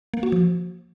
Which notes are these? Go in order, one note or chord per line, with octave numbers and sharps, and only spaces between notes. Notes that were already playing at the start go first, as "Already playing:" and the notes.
A#3
F#4
F3